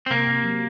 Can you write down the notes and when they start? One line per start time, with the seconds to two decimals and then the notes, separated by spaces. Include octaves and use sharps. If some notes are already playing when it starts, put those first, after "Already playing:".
0.06 C4
0.10 C3 A#3
0.27 C3
0.44 F#3